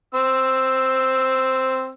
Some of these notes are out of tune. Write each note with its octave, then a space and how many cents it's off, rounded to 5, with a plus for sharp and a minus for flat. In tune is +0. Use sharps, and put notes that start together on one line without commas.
C4 +0 E6 +0